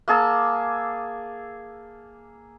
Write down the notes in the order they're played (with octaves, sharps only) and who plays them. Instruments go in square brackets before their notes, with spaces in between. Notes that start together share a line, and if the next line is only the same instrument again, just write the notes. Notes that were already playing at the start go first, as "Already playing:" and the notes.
[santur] A#3 G#4 A5 E6